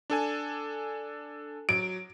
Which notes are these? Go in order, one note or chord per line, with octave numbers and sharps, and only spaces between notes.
D4 A4 G#5
F#3 D7